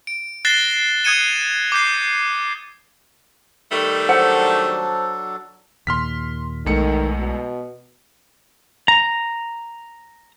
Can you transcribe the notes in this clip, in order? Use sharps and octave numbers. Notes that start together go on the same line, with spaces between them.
D7
F#6 A6 A#6 C7 E7 G7
D#6 F#6 G#6 C#7 D#7 E7
D6 G6 C7
D#3 G3 A3 B4
F#3 D4 A4 C5 F#5
D#2 A#2 C6 F6 B6
B1 E2 D#3 G#3 A3 C#7
B2
A#5